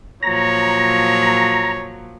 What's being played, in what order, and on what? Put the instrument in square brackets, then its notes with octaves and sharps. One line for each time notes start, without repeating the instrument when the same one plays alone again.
[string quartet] A#2 F3 F#3 [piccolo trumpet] C#5 [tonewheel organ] A#5